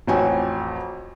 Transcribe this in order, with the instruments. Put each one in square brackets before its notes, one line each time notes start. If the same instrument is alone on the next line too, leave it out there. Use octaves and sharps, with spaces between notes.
[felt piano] A1 F2 F#4 C#5 G5 G#5